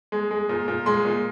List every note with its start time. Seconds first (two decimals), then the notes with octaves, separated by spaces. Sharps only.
0.12 G#3
0.31 G#3
0.49 A#2
0.68 A#2
0.86 G#3 C6
1.05 A#2